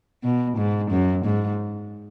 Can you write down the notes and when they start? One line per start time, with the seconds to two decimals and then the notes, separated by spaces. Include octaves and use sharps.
0.24 B2
0.57 G#2
0.91 F#2
1.25 G#2